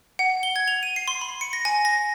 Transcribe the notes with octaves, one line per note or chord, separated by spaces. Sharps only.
F#5
G7
G#6
F7
D#7
C7
C6
B5
C#7
A#6
G#5
A#6